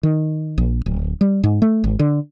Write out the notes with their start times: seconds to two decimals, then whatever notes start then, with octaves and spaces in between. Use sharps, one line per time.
0.03 D#3
0.58 A#1
0.86 D1
1.21 G3
1.44 G#2
1.62 A3
1.84 G#1
1.99 D3